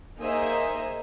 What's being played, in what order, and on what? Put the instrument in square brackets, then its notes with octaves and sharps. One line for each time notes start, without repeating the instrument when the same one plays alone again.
[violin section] A#3 D#4 G#4 C5 E5